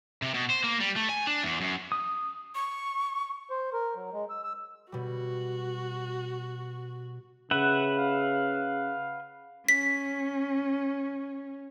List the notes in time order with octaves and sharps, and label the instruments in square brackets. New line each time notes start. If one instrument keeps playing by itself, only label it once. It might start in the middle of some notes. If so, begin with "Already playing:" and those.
[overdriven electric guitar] C3
B2
C5
A#3
G3
A3
G#5
D4
E2
F#2
[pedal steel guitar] D#6
[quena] C#6
[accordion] C5
A#4
F#3
G#3
E6
E6
[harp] B2 G3 [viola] F#4
[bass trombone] C#3 [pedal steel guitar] B4 E5 F#5
[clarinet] F5
[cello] C#4 [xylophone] B6